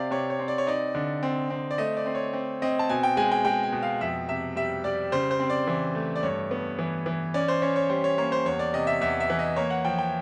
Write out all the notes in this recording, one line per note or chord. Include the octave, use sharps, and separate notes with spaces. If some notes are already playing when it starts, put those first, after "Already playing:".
Already playing: C3 C4 D5 F5
C3 C#5
C#5
C4
D5
C#5
D#4 D5
D3
C4
C4
D5
A3 D#5
D5
C4
C#5
C4
C4 D#5
A5
B2 G#5
G5
G#3 G#5
G5
G#3 G5
G#5
B2
F5
F2 E5
C3 E5
G3 E5
G3 D5
C#3 C5
C5
C4
D5
E3
A3
D5
G2 C#5
B3
E3
E3
C#4 D5
C5
C#4 C#5
C#5
G3 C5
C#5
A#3 C#5
C5
E2 C#5
D5
C3 D#5
E5
E2 E5
E5
E3
D#5
A#3 C#5
F#5
F3 G5
G5